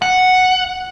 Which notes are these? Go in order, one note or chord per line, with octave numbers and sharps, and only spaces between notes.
F#5